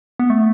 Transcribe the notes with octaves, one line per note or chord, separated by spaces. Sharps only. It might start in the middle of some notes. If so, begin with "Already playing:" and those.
B3
A3